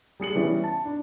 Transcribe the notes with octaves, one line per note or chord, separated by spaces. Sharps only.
G3 G#4 C#7 F#7
E3 G3 B3 C#4
A5
D4